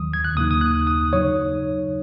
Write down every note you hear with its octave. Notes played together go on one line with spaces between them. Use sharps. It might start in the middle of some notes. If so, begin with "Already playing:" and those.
Already playing: D#2 D#3 F#3 D#6
G#6
F#6
D#2 C#3 A#3 D#4 D#6
D#6
F#6
D#6
C#3 F#3 D#4 C#5